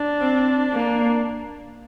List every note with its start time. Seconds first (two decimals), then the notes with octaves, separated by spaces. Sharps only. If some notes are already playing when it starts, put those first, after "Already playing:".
Already playing: D4
0.20 C4
0.73 A#3